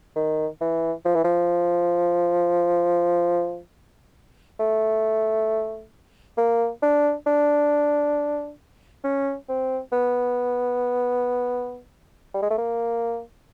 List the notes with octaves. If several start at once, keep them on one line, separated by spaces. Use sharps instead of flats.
D#3
E3
F3
E3
F3
A3
A#3
D4
D4
C#4
C4
B3
G3
G#3
A3
A#3